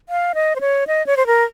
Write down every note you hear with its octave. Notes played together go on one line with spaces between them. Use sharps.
F5
D#5
C5
C#5
D#5
C#5
C5
A#4